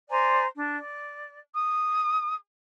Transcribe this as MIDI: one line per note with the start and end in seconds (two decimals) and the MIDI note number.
0.10 0.46 72
0.10 0.46 74
0.10 0.46 80
0.10 0.46 82
0.56 0.77 62
0.79 1.40 74
1.55 2.35 87